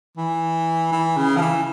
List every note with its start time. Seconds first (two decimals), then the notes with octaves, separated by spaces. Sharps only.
0.17 E3
0.92 E3
1.17 C#3
1.37 F3
1.42 E3